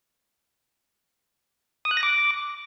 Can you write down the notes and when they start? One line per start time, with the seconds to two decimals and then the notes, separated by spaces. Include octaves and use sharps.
1.85 D#6
1.91 F#6
1.97 A#6
2.03 D6